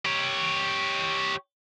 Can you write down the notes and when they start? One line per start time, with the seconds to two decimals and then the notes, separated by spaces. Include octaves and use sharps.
0.05 G4 C#5